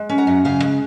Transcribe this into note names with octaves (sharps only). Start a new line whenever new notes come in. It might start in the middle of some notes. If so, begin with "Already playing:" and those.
Already playing: G#3
C#4
F#5 A#5
F#2
C#3 F5 G#5
G#3